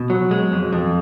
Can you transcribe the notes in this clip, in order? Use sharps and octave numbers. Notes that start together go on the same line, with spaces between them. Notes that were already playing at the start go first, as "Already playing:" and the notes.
Already playing: B2
F#3
G#3
F2
F2